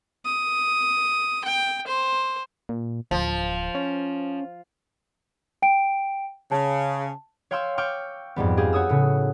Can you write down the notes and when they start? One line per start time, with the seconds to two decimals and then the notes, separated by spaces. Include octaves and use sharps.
0.25 D#6
1.44 G5
1.87 C5
2.69 A#2
3.11 D1 F3
3.75 C#4
5.62 G5 D7
6.52 C#3 A5
7.51 C#5 F5 G5 C6 C#6 E6
7.77 G5 C#6 D6 E6 F6
8.36 F2 G#2 G3 B3
8.57 G4 G#4 F5
8.73 F#4 C#5 D#6 E6
8.89 A2 C#3